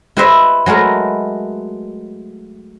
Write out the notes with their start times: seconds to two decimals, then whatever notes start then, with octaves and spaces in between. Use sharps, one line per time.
0.17 E4 G4 B4 C5 D#5 E5
0.66 F#3 G#3 A3 A#4 B4